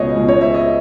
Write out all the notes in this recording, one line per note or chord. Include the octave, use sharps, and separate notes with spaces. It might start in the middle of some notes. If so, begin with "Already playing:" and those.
Already playing: C#2 B2 G#3 C#5 D#5
C#2 B2 G#3
C#5
E5
D#5